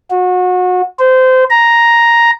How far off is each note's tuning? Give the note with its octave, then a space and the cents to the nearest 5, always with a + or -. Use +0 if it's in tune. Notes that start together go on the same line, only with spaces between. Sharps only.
F#4 -30
C5 -20
A#5 +5